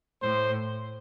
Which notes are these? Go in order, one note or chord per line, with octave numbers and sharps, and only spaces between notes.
A2 C5